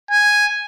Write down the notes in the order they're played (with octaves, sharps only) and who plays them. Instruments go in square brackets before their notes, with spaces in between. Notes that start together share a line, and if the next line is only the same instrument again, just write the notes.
[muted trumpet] G#5